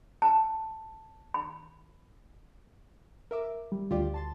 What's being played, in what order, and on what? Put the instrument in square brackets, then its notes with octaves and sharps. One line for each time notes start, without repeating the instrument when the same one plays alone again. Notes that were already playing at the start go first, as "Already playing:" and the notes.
[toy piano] A5
B5
[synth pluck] A#4 E5 D6
[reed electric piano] G3
[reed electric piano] D2 [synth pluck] F4 G4 D5
[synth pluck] A5 C6 A6